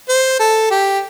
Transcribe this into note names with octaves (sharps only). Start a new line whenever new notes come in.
C5
A4
G4